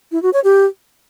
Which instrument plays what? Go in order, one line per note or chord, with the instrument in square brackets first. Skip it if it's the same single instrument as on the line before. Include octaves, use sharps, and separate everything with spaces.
[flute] E4
F#4
C#5
G4